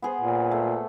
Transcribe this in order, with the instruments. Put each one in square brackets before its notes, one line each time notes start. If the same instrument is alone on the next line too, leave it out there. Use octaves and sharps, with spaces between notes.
[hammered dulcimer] B3 G#4 C5
[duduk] A#2
[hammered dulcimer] A3